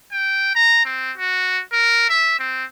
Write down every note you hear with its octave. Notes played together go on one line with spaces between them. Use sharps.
G5
A#5
C4
F#4
A#4
E5
C4